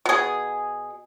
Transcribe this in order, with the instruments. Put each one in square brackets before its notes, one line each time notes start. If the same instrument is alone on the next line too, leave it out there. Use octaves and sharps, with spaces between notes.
[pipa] B2 G#4